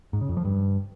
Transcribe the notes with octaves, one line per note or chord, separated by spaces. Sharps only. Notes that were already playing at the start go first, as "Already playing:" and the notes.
G#2
C#3
F2
F3
G2